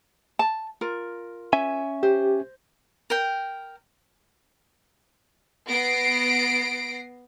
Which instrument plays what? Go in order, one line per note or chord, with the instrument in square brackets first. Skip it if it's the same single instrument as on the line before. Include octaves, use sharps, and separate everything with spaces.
[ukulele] A5
F4 A#4
[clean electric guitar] C#4 E5 G#5
[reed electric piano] G4 [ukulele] C5
[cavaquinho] A#4 G5
[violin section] B3 A#6 C7 D7